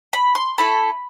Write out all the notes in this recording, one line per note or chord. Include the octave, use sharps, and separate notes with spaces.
B5
C6
A3 E4 A4 B5